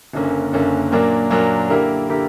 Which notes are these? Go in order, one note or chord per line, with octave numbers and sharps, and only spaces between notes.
F#1 F#2 D3 A#3 C#4
F#1 F#2 D3 A#3 C#4
A#2 F#3 A#3 D4 A#4
A#2 F#3 A#3 D4 A#4
D3 A#3 E4 G4 A#4
D3 A#3 E4 G4 A#4